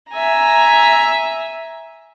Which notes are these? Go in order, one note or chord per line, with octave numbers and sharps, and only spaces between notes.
E5 G#5 A#5